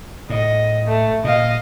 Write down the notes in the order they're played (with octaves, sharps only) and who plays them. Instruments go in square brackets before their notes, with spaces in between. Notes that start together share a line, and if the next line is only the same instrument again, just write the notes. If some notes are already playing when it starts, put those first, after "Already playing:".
[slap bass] A2 [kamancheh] D#5
[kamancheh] A3
[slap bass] A#2 [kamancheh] D#5 F5